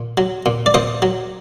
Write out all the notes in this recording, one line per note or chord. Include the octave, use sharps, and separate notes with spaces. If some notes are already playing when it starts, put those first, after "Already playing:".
Already playing: A#2
F#3
A#2
D5
A#2 C5 D#5
F#3